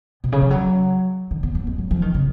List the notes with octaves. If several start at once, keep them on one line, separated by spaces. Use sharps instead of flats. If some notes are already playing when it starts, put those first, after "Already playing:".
B2
C#3
F3
F#3
D#3
B3
B3
G#3
F#3
F3
D#3
C#3